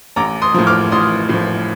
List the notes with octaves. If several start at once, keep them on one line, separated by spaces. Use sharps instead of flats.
A1 A#5 D6
C6 D#6
A2 F3
D6 F6
A1 C6 D#6
A2 F3